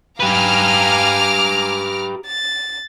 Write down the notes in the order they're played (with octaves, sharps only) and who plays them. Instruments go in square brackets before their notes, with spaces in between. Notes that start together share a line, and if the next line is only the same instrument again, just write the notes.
[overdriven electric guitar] G4 B4 [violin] F5 G#5 [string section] A#5 D6 F6
[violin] A6